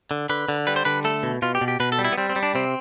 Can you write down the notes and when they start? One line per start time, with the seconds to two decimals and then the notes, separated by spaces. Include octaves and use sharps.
0.11 D3
0.29 D3 B4
0.49 D3
0.67 G3 B4
0.76 C5
0.85 D3 B4
1.04 A3 A4
1.23 B2
1.42 B2 F4
1.55 G4
1.61 B2
1.68 G4
1.80 B2 B4
1.92 A4
1.99 G3
2.05 E4
2.12 B3
2.18 G3 C4
2.30 C4
2.36 G3
2.43 D4
2.55 C3 C4